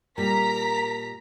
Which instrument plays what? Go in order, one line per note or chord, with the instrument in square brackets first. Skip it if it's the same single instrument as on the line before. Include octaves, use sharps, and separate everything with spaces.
[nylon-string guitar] A#2 G3 [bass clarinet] A#4 [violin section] A#5 B6